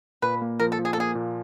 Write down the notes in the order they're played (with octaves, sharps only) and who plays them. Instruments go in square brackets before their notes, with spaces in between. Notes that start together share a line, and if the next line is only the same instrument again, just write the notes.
[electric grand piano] A#2 [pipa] B4
[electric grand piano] A#3
[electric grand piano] F3 [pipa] A#4
[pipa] A4
[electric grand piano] F3
[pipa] G#4
A4
[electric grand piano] A#3 [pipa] G#4
[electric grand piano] A#2